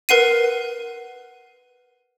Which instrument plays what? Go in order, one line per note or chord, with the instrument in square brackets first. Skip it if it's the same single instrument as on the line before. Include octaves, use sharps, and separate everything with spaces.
[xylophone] A#4 B4 F#5 C7 D#7